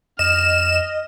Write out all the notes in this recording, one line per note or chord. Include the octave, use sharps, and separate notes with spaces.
F2 D#5 F6 E7